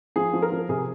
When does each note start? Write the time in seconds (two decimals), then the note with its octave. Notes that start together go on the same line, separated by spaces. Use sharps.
0.16 F3 G#4
0.34 F3
0.42 A#4
0.52 F3
0.69 C3 G#4